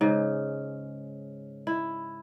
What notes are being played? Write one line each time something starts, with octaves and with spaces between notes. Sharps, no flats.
G#2 C#3
E4